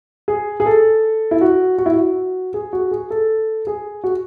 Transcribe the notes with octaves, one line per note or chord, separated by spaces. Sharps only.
G#4
G#4
A4
E4
F#4
F#4
E4
F#4
G#4
F#4
G#4
A4
G#4
F#4